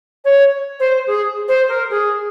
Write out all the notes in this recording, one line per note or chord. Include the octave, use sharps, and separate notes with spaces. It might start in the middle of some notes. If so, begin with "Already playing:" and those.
C#5
C5
G#4
C5
A#4
G#4